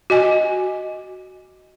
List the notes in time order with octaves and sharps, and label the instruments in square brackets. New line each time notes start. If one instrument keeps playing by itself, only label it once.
[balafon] F#4 D#5 G#5